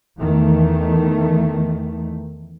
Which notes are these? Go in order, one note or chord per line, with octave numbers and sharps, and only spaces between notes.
E2 D#3 A3